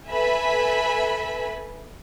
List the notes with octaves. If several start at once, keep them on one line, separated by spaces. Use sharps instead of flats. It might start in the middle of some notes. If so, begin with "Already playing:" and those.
A4 B4 E5 G#5 B5